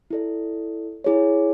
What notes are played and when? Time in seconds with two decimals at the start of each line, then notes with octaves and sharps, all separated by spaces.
0.10 E4 A4 D5
1.04 E4 G#4 C#5